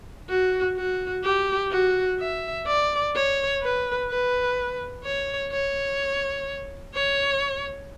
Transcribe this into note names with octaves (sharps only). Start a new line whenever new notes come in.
F#4
F#4
G4
F#4
E5
D5
C#5
B4
B4
C#5
C#5
C#5